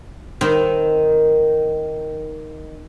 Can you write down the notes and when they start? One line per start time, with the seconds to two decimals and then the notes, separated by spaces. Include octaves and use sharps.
0.41 D#3 C4